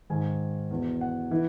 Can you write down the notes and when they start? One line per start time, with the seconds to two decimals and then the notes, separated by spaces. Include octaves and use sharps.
0.10 G#2 D#3 G#5
0.71 E2 B2
1.01 F#5
1.31 E3